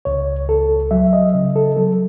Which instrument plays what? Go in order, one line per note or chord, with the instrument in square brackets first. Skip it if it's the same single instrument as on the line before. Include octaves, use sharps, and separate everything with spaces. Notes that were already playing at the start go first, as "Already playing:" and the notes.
[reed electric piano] C#2 C#5
C#2 A4
F#3 E5
D#5
C#3 D#5
A4
F#3 A4